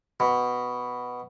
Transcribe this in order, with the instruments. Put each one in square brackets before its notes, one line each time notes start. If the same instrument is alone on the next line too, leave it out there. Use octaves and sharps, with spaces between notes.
[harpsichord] B2